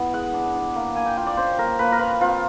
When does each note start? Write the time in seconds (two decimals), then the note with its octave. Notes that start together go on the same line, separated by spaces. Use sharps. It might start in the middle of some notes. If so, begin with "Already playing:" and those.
Already playing: B3 E4
0.14 G#3 F#5
0.33 D4
0.54 D4
0.76 A#3
0.95 A#3 G#5
1.06 G5
1.17 F4 G5
1.27 D5
1.37 C#4 C5
1.59 A#3 A#4
1.79 A#3 B4
1.92 A#4
1.99 F4 B4
2.21 C4 F4